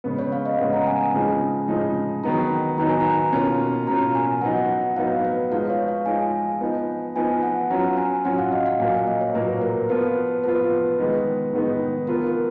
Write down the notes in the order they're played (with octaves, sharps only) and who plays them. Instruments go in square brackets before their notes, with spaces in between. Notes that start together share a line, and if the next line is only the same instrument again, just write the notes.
[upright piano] C#3 G#3 B3
[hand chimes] C#5
F5
D#5
[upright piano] C#3 G#3 B3 [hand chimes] F#5
[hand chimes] A#5
G#5
G#5
[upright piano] C#3 F3 G#3 D#4
C#3 F3 G#3 D#4
[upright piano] D#3 F#3 B3 D#4 [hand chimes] A#5
[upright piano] D#3 F#3 B3 D#4 [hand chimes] A#5
[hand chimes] G#5
A#5
[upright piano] B2 A#3 C#4 F4
[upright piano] B2 A#3 C#4 F4 [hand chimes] A#5
[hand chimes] G#5
[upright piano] F#3 B3 D#4 [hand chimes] F#5
[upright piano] F#3 B3 D#4 [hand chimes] F5
[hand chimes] B4
[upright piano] F3 G#3 D#4 [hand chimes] F5
[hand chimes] C#5
F5
[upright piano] F3 G#3 D#4 [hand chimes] G#5
[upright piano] F3 B3 D#4
[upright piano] F3 B3 D#4 [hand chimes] G#5
[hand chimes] F#5
[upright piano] F#3 C#4 F4 [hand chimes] A#5
[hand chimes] G#5
[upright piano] F#3 C#4 F4 [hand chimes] F#5
[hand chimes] F5
D#5
F5
[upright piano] A#2 F#3 A#3 [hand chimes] G#5
[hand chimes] F5
D#5
C#5
[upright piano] A#2 F#3 A#3 [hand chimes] B4
[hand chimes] A#4
[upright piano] F3 B3 F4 [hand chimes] B4
[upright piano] F3 B3 F4 [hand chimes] B4
[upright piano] D#3 G#3 B3 D#4
D#3 G#3 B3 D#4
[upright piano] F3 B3 F4 [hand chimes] A#4
[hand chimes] A#4